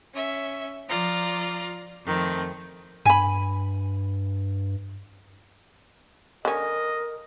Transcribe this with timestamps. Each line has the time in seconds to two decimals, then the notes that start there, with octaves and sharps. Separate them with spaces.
0.13 C#4 E5
0.88 F3 F4 D5 A#5
2.05 F2 D#3 A3 C4
3.06 G2 G#5 B5
6.45 D3 C#4 A#4 D#5